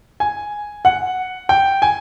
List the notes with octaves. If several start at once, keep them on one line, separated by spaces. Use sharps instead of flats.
G#5
F#5
G5
G#5